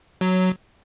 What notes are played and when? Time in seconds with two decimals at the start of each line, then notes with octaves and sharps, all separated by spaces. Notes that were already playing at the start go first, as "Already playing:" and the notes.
0.21 F#3